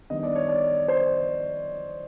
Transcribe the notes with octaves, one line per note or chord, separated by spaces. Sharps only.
D#3 G3 B3 D4 D#5
D5
C#5
D5
C5